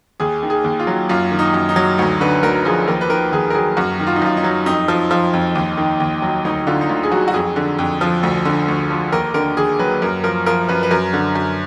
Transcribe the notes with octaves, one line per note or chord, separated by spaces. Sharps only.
D#2 G#4
D#3
G#4
D#2
F4
F#3
F#2 F4
D#3
D#4
F#2
D#4
F#3
D2 D#4
D3 B4
D2 A#4
F3 G#4
D#2 A#4
B4
D#3 A#4
D#2 G#4
A#4
F#3 G#4
F#2 F#4
D#3
F4
D#4
F#2 F4
D#4
F#3
F2 D#4
F3
F3
F2
D#2
D#3
D#2
F#3
D2 D#4
D3 F4
D#4
D2 F4
G#4
F#3 F#4
F#4
F2 G#4
D3
F2
F3
D2
D3
D2
F3
D#2 A#4
D3 A#4
D#2 G#4
F#3 B4
F#2 A#4
F3 A#4
F3 A#4
F#2 B4
B4
F#2 A#4
D3
F#2